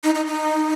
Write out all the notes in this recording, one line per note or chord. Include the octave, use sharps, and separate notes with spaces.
D#4
D#4
D#4